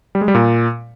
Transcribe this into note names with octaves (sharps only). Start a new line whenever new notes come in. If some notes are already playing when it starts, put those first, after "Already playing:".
G3
G#3
G3
A#2